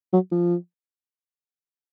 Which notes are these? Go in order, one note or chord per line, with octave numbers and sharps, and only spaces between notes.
F#3
F3